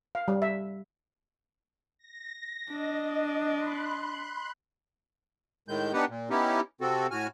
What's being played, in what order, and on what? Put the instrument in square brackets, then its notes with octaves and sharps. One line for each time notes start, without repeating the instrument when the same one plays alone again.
[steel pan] F5
G3
E5
[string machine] A#6
[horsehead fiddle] D4 [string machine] D#5
[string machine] B5 C6 F#6
[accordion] A2 D#3 G#3 G6
B3 D4 D#4 G4 B4 F#5
A#2
B3 C#4 D#4 E4 G4
C3 C4 F#4 A4
A2 F#4 G#5 F6